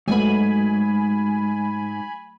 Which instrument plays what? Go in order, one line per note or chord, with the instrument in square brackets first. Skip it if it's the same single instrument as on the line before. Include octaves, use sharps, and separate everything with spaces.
[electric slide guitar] G#2 [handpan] F#3 A3 B3 [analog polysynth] G#5 B5